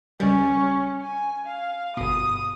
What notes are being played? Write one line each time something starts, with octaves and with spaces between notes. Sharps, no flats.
C#2 G3 C#4
G#5
F5
G1 B2 D#6